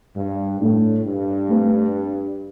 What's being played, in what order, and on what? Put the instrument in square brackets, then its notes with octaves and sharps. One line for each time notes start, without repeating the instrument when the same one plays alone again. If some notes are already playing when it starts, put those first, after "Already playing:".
[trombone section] G2
[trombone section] A2 [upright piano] A3 D4 A4
[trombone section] G2
[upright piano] A3 C4 G4 B4